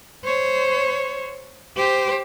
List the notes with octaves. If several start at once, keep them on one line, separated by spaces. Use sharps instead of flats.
C5 C#5
G4 C5